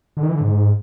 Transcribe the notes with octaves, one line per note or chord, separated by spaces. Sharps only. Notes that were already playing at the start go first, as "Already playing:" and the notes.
D3
D#3
E3
D3
G#2